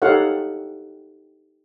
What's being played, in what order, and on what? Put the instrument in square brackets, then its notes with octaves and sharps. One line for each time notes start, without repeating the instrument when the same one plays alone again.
[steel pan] D#4 G4 A4 C#5 F5 F#5